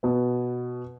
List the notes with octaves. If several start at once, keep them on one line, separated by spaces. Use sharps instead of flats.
B2 B3